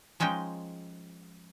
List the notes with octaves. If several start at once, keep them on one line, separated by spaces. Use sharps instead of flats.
F3 G#3 C#4 D#4 G5